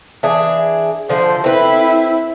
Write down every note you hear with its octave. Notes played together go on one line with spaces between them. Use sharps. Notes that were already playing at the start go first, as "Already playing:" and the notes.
E3 D4 G#4
D3 F3 C5
C4 E4 B4